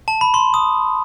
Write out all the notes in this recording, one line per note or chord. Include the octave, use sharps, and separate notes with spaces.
A5
B5
C6
D#6